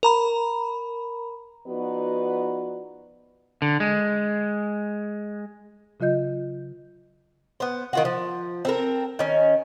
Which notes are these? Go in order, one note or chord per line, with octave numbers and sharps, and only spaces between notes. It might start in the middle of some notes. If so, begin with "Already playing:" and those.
A#4 A#5 B5
F3 B3 D#4 F#4 B4 D5
D3
G#3
C#3 F#3 F4 D#5 G6
B3 C5
D#3 F4 F#4
F3
C4 A4 A#4
D#3 C#4